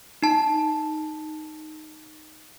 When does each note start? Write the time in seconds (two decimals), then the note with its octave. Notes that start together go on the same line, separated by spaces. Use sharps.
0.22 D#4 A5